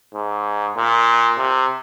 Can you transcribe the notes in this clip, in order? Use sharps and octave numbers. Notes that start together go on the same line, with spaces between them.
G#2
A#2
C3